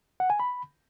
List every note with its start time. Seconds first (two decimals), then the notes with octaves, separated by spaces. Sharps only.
0.20 F#5
0.30 G#5
0.40 B5